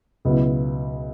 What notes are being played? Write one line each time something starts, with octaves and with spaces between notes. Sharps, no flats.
C#2 B2 F#3 B3 E4